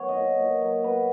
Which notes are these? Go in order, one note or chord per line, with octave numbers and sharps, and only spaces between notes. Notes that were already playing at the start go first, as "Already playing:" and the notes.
Already playing: F#3 B3 C#5
D#5
A#2
A#2
F#3
B3 B4